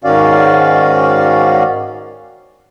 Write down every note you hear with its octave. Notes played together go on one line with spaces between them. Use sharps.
G#2 D#3 C#4 F#4 D5 F5